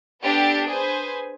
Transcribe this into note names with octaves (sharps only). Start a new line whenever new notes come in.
B3 D4 G4 A4 D5 A6
G#4 B4 C5 G#5